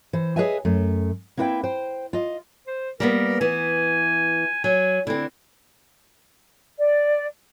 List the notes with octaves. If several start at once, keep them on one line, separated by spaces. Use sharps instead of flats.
E3 C5
G#4 B4 C#5 D#5 E5 G#5
F#2 A3
A#3 C4 E4 B4 E5 G5
C5 G5
F4 D#5
C5
G3 A#3 B3 A#4
E3 B3 G#5
F#3 G#5
D3 C4 E4
D5